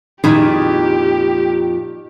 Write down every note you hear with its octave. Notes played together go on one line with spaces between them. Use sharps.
F2 A#2 D#3 D#4 E4 G4 G#4